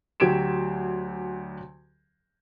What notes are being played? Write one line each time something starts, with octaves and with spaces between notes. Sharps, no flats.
D2 F#3 G4 G#6 D7 E7